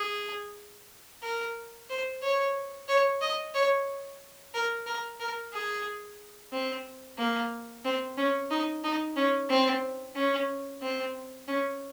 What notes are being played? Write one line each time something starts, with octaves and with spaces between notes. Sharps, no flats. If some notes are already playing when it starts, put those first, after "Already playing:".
Already playing: G#4
A#4
C5
C#5
C#5
D#5
C#5
A#4
A#4
A#4
G#4
C4
A#3
C4
C#4
D#4
D#4
C#4
C4
C#4
C4
C#4